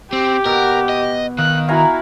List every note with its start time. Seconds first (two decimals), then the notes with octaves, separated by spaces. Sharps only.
0.13 C4 G4
0.46 B2 A#4
0.89 D#5
1.39 D#3 F5 F#6
1.69 E4 F#4 F5 G#5 A#5